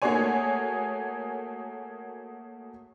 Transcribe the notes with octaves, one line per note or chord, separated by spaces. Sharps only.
A3 A#3 F#4 G#4 C#5 G#5